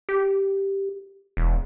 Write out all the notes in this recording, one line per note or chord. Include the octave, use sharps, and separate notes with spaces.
G4
E1